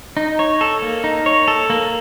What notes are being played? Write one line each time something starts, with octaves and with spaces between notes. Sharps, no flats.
D#4
C#5
A4
A#3
D#4
C#5
A4
A#3